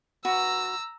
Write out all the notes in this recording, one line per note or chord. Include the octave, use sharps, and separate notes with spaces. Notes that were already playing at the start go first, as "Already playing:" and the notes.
F#4 B4 A#5 E6